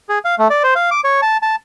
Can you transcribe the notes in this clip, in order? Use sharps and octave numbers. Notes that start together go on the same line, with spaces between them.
G#4
F5
A3
D5
C5
F5
D6
C#5
A5
A5